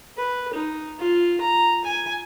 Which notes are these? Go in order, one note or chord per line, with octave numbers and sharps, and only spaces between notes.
B4
D#4
F4
A#5
G#5